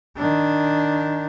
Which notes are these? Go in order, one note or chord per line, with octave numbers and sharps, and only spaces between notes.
D#3 D4